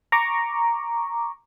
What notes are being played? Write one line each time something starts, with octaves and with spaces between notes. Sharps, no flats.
A#5 C#6 D6